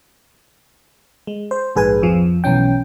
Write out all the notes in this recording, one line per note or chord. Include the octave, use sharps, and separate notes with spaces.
G#3
C5
A#1 G#2 G#4 B4 G#5
F2 F3
B1 E3 C#4 G5